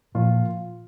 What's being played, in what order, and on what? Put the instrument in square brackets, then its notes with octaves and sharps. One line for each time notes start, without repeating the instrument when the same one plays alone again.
[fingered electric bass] A#2 [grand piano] F3 F4